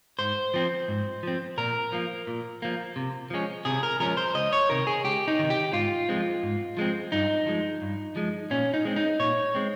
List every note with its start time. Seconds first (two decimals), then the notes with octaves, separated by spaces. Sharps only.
0.19 G#2 C5
0.54 F3 C4
0.88 G#2
1.23 F3 C4
1.57 A#2 A#4
1.93 F3 A#3
2.27 A#2
2.62 F3 A#3
2.96 C3
3.30 F3 G#3 C#4
3.65 C3 G#4
3.83 A#4
4.00 F3 G#3 C#4 A#4
4.17 C5
4.35 C#2 D#5
4.53 C#5
4.69 C3 D#3 A#4
4.87 G#4
5.04 C#2 G4
5.28 D#4
5.39 C3 D#3
5.50 G4
5.73 G#2 F4
6.09 F3 G#3 C4
6.43 G#2
6.77 F3 G#3 C4
7.12 G2 D#4
7.46 F3 G#3
7.82 G2
8.16 F3 G#3
8.50 A#2 C#4
8.74 D#4
8.85 G#3 C4
8.96 D#4
9.19 A#2 C#5
9.55 G#3 C4